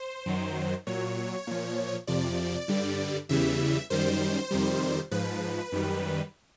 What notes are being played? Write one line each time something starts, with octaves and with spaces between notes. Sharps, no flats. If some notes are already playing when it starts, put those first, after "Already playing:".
Already playing: C5
F#2 D#3 F#3
A#2 F#3 C#5
A#2 F3
F2 C3 F3 D5
G2 D3 G3
E2 C#3 E3 G3 E5
F#2 D#3 G3 C5
F2 C3 D#3 G3
G#2 F3 B4
F#2 D#3 G3